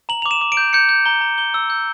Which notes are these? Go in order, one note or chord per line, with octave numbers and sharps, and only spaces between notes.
A#5 F#7
D6 F7
E7
D6
D7
G6
G6 C#7
G6
A#5 G7
A#5
G6 G7
E6
G6